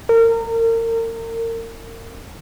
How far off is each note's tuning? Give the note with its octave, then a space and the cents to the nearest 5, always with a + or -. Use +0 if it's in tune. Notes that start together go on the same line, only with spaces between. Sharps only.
A#4 -35